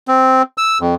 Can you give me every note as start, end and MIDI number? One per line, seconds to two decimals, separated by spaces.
0.08 0.42 60
0.58 0.78 88
0.81 0.95 41